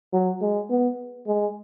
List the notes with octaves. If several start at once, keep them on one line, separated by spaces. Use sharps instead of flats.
F#3
G#3
B3
G#3